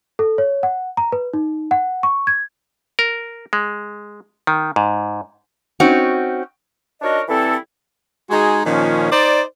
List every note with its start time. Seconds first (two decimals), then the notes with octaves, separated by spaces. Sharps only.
0.19 A4
0.38 C#5
0.63 F#5
0.97 A#5
1.12 B4
1.33 D#4
1.71 F#5
2.03 C#6
2.27 G#6
2.99 A#4
3.53 G#3
4.47 D#3
4.76 G#2
5.80 C4 C#4 D#4 F#4
7.02 D4 D#4 F#4 A#4 C#5 D#5
7.29 E3 G3 C4 E4 A4
8.30 G#3 D#4 F#4 G#4
8.66 A#2 D#3 F3 C#4
9.11 D#4 C5 D5